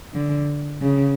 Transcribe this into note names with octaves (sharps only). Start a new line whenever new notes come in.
D3
C#3